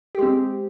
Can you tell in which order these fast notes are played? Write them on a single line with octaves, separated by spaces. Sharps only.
G4 G#3 C4